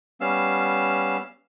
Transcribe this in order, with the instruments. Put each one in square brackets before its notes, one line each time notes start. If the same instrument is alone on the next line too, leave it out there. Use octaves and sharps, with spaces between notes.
[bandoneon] G3 B3 C#4 F5 E6